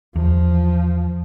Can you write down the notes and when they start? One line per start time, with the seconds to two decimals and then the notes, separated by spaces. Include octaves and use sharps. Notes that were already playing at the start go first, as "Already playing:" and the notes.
0.16 E2 F3